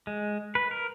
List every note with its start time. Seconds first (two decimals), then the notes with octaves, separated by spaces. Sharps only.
0.07 G#3
0.55 B4
0.71 A#4